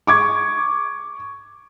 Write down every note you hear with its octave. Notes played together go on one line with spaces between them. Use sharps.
C#6 D6 G#6